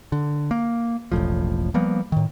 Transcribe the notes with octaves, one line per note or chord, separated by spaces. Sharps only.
D3
A#3
E1 A1 A2 F3
F3 G3 A#3 B3
A2 D#3